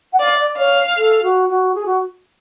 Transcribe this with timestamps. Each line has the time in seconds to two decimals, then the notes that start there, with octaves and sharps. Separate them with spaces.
0.13 F#5
0.20 D5 F5
0.38 D5
0.57 C#5 F5
0.97 A4
1.23 F#4
1.49 F#4
1.75 G#4
1.86 F#4